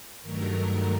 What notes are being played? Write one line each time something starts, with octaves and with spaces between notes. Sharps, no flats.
G2 D#3 F#3 A3 A#4